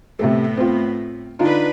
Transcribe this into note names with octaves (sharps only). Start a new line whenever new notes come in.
A2 C3 A3 B3 A4
C4 F4
D3 D4 D#4 F4 B4